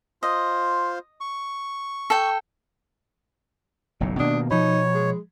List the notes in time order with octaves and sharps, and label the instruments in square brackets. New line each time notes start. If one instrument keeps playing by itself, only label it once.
[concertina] F4 C5 [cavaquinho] D#5
[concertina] C#6
[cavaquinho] A4 G5
[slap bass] F#1 B1 A2
[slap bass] B2 D#3 A#3 [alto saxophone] D4 [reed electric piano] D#6
[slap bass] B2 [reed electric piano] F3 B5 [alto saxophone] D#4 [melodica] C#5
[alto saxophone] G#3